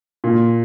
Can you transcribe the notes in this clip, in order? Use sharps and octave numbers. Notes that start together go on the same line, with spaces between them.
A#2